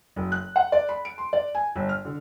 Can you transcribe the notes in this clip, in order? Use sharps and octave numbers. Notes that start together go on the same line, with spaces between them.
F#1
F#6
F#5
D5
B5
D7
C6
D5
G#5
G1
F6
D3